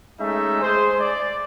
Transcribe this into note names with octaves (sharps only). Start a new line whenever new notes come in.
G#3 A3 C#4 D#4 E5
G#3 G#4 C5
D5